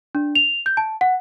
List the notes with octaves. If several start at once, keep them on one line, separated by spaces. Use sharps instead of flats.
D4
F7
G6
A5
F#5